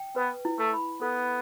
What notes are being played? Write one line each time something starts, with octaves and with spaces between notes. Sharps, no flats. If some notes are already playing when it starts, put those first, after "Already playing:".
Already playing: G5
B3 B4
E4
A3
B5
B3 A4